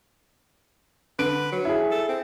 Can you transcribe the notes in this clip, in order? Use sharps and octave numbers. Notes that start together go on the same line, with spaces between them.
D3 B4 D7
F#3
E4 G#4
A4
C4